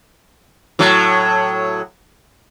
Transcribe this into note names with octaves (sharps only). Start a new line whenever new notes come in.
A2 F#3